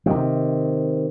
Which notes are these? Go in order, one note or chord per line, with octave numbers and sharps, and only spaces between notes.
C3 D#3